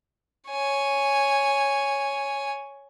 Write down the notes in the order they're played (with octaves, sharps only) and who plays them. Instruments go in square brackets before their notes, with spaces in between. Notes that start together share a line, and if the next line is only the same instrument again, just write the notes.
[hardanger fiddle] C#5 G#5